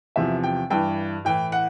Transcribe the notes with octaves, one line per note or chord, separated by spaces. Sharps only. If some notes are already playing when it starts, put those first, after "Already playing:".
E2 C3 F3 E5
G5
G2 E3 G5
A2 E3 G5
F#5